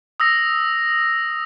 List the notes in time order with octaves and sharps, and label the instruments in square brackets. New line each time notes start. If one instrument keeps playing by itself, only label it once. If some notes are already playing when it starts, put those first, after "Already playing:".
[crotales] D#6 E6 A#6